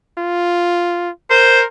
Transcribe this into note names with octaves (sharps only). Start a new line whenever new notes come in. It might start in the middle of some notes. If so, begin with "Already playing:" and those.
F4
A#4 C5